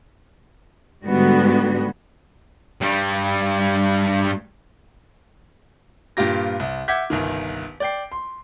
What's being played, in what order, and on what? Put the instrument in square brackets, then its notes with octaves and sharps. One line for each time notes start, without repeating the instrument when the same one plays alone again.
[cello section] G#2 D3 G3 B3 F#4
[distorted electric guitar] G2 G3
[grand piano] G2 A#2 F4 G4 A#6
C2
E5 F#5 D6 G6 G#6 B6
G1 C2 D#3
D5 G5 C7
C6